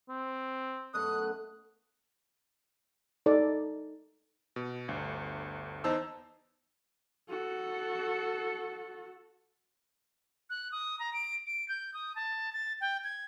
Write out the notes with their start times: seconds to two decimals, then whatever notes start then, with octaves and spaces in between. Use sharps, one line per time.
0.09 C4
0.94 F#2 B2 A3 D#6 F#6
3.26 D#4 A4 D5
4.56 B2
4.88 G1 D2
5.84 E2 D#4 C5 A5 E6
7.30 F#4 A4
10.50 F#6
10.72 D#6
10.99 A#5
11.13 D7
11.46 D7
11.68 G6
11.94 D#6
12.16 A5
12.53 A6
12.81 G5
13.04 G#6